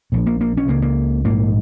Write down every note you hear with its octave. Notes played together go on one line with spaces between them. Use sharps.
A#1 A#2
A#3
A#3
C#4
C#2 C#3 A#3
A#3
A#1 G#2 A#3